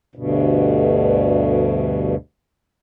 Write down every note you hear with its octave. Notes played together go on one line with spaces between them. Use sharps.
D2 G2 B2